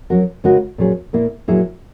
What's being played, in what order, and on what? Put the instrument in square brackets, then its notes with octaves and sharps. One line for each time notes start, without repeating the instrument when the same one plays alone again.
[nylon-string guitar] F#3 C#4 F#4 A#4
C#3 G#3 D#4 F#4 A#4
A#2 F#3 C#4 G#4
A#2 A#3 E4 A#4
A#2 F#3 A#3 E4 G#4